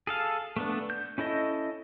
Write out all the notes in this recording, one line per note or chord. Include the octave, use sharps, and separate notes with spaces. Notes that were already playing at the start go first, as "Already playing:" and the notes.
G#4 A4 F5
A3 B3 D4
G6
C#4 E4 A4 D#5